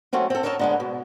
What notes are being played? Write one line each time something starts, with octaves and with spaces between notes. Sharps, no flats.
D#2 F#3 A3 C4 C#4
C4 A4
A4 A#4 C#5 D#5 E5 A5
D3 G#3 B3
B2